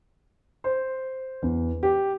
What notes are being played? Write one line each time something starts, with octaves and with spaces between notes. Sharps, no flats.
C5
E2
G4